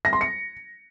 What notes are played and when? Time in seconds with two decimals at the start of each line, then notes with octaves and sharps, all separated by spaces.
0.05 A#6
0.13 C6
0.21 C#7